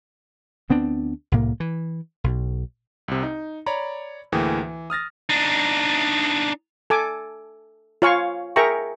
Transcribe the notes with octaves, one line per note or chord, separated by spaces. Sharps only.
D2 B3 C4 D4
C2 A2 A#3
E3
B1
C2 C3
D#4
C#5 D5 A#5 B5
D2 A2 E3 A#3 G#4 G5
E3
D#6 F6 A6 A#6
D4 D#4
A4 G#5 D6
F4 C#5 F5 G#5 C#6
G#4 A#4 E5 G5 A#5 C#6